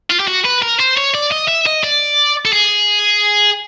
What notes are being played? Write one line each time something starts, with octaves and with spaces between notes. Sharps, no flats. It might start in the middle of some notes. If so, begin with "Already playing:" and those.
F4
G4
F#4
B4
A#4
C5
C#5
D5
D#5
E5
D#5
D5
A4
G#4